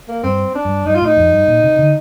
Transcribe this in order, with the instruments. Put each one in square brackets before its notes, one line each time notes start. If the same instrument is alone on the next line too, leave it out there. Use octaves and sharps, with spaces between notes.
[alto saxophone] A#3
[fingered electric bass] G2 [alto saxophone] C4
[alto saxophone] D4
[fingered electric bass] G2
[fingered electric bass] G2 [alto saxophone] D#4
[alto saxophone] F4
[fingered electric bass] A2 [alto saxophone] D#4
[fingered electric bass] F2
G2
A#2
C3
D3